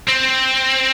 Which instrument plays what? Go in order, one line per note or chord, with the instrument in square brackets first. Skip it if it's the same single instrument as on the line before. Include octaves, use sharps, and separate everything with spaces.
[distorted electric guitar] C4